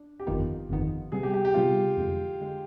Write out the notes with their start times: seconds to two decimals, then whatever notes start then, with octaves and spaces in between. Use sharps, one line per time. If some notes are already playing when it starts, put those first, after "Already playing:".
Already playing: D4
0.20 G4
0.27 G1 F2 D#3 B3 D#4 F4
0.69 G1 F2 D#3 B3 D#4
1.12 C3 G3 B3 G#4
1.23 G4
1.34 G4
1.45 G4
1.54 C3 G3 B3 F4
1.97 F2 D3 G#3
2.41 D3 G#3